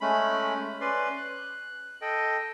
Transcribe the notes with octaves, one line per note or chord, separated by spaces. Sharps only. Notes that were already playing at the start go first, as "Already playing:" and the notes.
G#3 A3 C#4 B5
C#4 B4 D5 C6
F#6
A4 D#5 G5